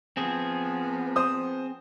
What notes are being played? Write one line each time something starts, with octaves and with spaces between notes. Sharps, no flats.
F3 B3 C4 G#4
C5 D#6